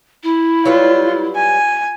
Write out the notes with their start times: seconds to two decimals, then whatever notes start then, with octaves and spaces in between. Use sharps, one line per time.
0.23 E4
0.65 F#3 G3 F4 B4
1.36 G#5